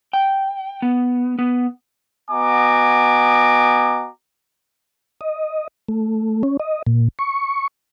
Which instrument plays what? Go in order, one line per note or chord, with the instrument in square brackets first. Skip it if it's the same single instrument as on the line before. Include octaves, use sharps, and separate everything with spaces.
[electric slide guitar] G5
B3
B3
[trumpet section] B3 F#4 D#5 G#5 A#5 D6
[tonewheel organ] D#5
A3
C#4
D#5
A#2
C#6